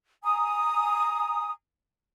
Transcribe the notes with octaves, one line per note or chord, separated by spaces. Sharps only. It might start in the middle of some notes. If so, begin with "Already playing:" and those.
G#5 A#5 D#6